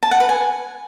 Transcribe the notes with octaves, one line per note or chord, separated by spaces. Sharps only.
A5
F#5
B4
G#5